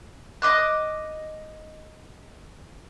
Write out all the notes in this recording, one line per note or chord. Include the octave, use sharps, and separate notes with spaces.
D#5 D6 F#6